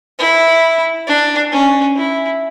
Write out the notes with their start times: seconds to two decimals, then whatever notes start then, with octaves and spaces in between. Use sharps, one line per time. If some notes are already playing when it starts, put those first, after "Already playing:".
0.19 E4
1.07 D4
1.52 C#4
1.96 E4